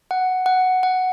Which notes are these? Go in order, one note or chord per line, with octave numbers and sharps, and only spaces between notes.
F#5
F#5
F#5